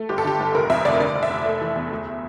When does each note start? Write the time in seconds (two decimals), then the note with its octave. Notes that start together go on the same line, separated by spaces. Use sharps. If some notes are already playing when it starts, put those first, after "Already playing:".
Already playing: A3
0.09 G1 G4
0.18 A4
0.25 D3 G4
0.40 G1
0.55 F1 A#4
0.70 F2 E5
0.85 F1 D5
1.00 D3 D5
1.15 F1
1.23 E5
1.30 F1
1.46 A3
1.61 E3
1.76 E2
1.91 D2